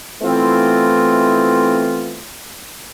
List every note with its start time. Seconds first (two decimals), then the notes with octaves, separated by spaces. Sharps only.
0.22 E3 A3 B3 C4 E4 F4